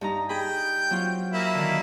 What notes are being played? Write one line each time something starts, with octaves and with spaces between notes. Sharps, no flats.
G2 D#4 A#5
G#4 G5 B5
F#3 C4 F4
A#3 E4
D3 D#3